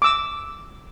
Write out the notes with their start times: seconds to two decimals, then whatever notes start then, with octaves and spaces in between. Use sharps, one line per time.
0.02 D6 E6